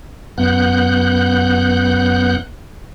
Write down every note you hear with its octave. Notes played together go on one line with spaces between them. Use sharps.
F#2 B3 F#5 F#6 G6